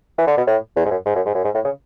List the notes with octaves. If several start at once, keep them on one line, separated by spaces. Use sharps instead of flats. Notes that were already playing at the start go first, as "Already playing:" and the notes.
E3
D3
B2
A2
E2
G#2
F#2
G#2
F#2
G#2
F#2
G#2
A2
C#3